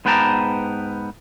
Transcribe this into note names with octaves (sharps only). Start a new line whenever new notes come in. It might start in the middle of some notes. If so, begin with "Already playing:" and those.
G#2 B3 B4 G5 A5 A#5